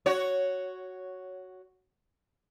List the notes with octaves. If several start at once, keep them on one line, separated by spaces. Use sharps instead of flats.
F#4 C#5